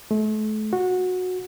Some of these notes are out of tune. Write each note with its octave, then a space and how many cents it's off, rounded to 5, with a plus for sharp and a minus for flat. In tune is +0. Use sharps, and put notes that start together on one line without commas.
A3 -35
F#4 -15